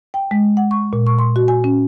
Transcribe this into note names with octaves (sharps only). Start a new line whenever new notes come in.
G5
G#3
F#5
C#6
A#2
C#6
C6
F#4
G#5
C#4